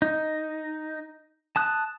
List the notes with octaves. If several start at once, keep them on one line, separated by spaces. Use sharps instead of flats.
D#4
A5 D#6 F#6